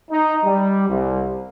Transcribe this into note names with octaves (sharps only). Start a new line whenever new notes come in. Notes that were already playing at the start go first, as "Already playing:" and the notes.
D#4
G3
C2